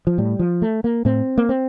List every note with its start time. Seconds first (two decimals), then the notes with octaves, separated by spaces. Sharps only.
0.07 F3
0.18 A2 G3
0.39 F3
0.62 A3
0.84 A#3
1.05 A2 C4
1.38 A#3
1.49 C4